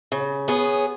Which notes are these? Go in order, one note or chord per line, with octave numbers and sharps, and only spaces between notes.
C#3
B3 G#4 C#5